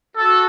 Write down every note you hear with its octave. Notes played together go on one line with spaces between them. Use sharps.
F#4 A4